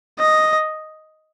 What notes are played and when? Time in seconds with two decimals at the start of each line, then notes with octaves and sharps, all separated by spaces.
0.19 D#5